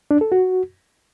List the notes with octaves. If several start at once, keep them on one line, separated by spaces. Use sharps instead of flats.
D4
A4
F#4